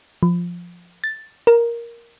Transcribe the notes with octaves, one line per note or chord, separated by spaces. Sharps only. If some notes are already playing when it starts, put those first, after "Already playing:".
F3
A6
A#4